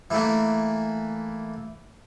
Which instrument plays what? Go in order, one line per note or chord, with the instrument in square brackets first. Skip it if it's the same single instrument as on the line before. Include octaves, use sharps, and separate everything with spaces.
[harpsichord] E3 A3 A#3